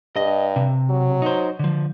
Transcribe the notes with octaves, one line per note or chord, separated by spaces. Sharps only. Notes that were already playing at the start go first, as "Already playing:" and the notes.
G2 D#5
C3
F#3
D#4 C5
D3 F3